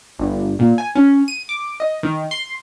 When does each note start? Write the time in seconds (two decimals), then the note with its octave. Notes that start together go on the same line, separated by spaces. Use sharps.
0.19 G1
0.59 A#2
0.78 G#5
0.95 C#4
1.28 D#7
1.49 D6
1.80 D#5
2.03 D#3
2.31 C6